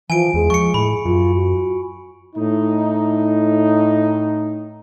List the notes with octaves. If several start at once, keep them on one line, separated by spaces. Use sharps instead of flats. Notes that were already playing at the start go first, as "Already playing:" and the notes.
E3 F3 G#5 D7
E2 G#3
F3 C#6 C#7
A2 B5
F#2 F4
F#4
A2 D#4